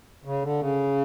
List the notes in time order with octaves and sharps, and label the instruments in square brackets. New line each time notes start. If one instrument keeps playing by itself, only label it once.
[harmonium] C#3
D3
C#3